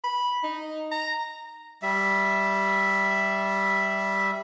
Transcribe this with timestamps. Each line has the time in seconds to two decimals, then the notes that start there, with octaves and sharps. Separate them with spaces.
0.04 B5
0.44 D#4
0.92 A#5
1.82 G3 E5